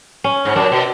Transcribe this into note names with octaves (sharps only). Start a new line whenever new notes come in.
C#4
G#2
F#2 D4
B2